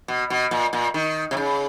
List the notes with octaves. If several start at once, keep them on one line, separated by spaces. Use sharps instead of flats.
B2
B2
A#2
A#2
D#3
C3
C#3